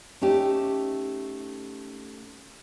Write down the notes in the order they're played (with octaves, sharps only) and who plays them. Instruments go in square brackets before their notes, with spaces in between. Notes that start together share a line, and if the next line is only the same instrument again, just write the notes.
[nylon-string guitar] A3 C#4 D#4 G4